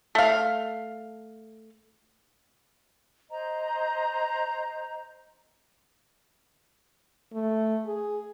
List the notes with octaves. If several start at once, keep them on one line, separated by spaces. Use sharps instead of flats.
A3 F5
C5 D#5 A#5
A3
G#4